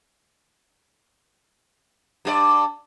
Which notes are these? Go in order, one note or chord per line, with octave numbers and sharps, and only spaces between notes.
G2 F#4 D5